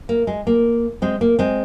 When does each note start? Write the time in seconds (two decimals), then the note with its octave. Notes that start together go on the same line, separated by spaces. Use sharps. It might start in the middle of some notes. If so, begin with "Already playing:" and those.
0.09 A#3
0.27 G#3
0.47 A#3
1.02 G#3 C4
1.21 A#3
1.39 G#3 C4